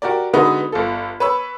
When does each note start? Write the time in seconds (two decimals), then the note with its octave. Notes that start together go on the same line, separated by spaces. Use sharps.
0.02 F#4 G4 A#4 D5
0.33 D3 G#3 B3 D#4 F#4 B4
0.72 G1 F4 A4
1.20 B4 C#5 B5 E6